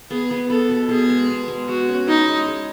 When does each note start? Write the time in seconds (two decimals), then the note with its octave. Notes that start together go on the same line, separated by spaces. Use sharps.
0.10 B3 G#4
0.31 B3
0.50 B3 A4
0.69 B2
0.89 B2 G#4
1.10 G#3
1.29 B2
1.48 G#3
1.68 G#3 F#4
1.88 C#4
2.08 D#4 E4
2.28 G#3
2.47 G#3